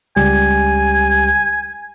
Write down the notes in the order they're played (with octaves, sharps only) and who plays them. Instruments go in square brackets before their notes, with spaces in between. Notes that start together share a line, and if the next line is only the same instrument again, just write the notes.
[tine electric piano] C#2 G3 G4 [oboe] G#5